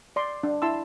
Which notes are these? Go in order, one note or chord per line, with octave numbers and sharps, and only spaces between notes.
D5 C6
D4
E4 A5 C6 E6